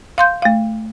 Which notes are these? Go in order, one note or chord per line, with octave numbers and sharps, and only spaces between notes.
F5 C6 G6
A3 F5